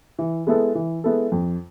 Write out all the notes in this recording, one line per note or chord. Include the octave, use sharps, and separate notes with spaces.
E3
G#3 B3 E4 A4
E3
G#3 B3 E4 A4
F2